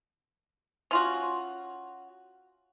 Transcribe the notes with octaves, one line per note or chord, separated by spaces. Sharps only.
C#4 F4 F#4